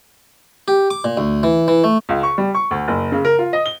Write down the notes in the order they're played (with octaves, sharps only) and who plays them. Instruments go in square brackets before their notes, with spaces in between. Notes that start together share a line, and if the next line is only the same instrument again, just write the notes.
[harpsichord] G4
D6
A#2
D2
E3
E3
A3
[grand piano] C#2
C#6
G3
C#6
D2
F#1
C#3
A#4
F4
D#5
G7